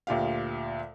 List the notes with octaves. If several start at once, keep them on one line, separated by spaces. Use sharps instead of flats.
D2 A#2 G4 F5